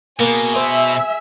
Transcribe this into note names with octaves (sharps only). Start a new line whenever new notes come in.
B2 A#3 G#4
C5 E5